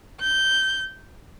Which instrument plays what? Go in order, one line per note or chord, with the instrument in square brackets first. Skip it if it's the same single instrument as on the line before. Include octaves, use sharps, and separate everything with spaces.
[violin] G6